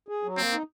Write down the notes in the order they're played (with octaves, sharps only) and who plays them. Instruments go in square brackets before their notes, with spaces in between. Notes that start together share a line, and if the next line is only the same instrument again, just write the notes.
[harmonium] G#4
F#3
[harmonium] A#3 [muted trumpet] C4
[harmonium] D#4